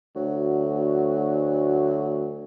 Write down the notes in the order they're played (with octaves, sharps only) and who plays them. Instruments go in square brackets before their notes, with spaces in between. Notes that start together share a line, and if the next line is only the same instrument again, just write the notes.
[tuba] D2 [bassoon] F#3